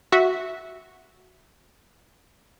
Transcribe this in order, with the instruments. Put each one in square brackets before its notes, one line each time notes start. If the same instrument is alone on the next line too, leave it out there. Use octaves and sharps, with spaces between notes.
[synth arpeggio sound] F#4 E5